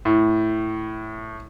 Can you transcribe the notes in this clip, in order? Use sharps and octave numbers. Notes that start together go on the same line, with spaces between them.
A2